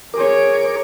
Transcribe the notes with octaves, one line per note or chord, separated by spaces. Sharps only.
G#4 A#4 C#5 D6